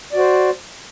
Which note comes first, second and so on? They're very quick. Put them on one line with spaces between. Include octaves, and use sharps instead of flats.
D5 F#4 C5